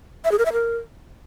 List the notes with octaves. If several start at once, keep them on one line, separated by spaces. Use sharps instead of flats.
E5
G#4
A#4
E5
A#4